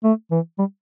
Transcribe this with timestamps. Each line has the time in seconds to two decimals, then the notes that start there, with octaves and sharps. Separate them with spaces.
0.04 A3
0.31 E3
0.58 G3